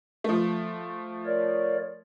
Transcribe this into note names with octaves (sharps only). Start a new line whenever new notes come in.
F3 A3
A#4 C#5 D5